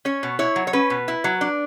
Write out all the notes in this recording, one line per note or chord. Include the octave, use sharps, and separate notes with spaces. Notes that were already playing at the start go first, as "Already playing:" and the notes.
C#4 C#5
B2
E4 C#5
F#3
C#5
C#4 B4
B2
E4
F#3
D4